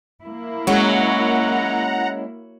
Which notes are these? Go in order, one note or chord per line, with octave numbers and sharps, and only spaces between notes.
A#3 E4
F#3 G#3 C#4 F#5 A#5